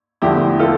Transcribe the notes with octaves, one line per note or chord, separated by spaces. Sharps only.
E2 D3 F3 A3 E4 G4
F4 A4